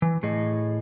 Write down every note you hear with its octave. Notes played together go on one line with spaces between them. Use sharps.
E3
A2 G#4 D#5